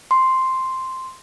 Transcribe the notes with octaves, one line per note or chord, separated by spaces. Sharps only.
C6